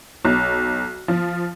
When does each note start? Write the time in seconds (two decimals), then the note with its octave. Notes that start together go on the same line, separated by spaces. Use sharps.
0.25 B1
1.08 F3